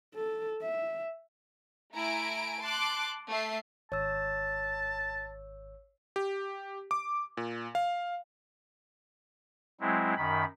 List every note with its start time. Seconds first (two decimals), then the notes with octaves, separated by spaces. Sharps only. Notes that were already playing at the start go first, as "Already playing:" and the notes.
0.15 A4
0.61 E5
1.95 A3 E4 G#5 A#5 D7
2.61 A5 C6 D6 F#6
3.31 A3 C7
3.92 G#1 C#5 A5 E6
6.16 G4
6.91 D6
7.37 A#2
7.75 F5
9.81 F#3 G#3 C4 E4
10.17 F#2 D#3 B5